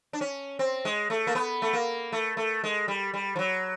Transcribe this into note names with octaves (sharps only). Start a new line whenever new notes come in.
D4
C#4
C4
G#3
A3
A#3
B3
A3
A#3
A3
A3
G#3
G3
G3
F3
F#3